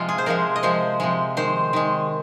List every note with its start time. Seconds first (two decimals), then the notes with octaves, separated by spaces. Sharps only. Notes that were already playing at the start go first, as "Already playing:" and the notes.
Already playing: C3 F3 G#3 F4
0.09 G#4
0.18 C5
0.26 C3 F3 G#3 A#4
0.56 D#5
0.63 C3 F3 G#3 C5
1.00 C3 F3 G#3
1.37 D#3 G#3 C5
1.73 D#3 G#3